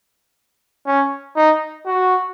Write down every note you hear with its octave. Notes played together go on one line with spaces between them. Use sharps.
C#4
D#4
F#4